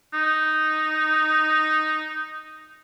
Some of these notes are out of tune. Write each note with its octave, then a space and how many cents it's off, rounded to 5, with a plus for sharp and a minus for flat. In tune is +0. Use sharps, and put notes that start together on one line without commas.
D#4 -5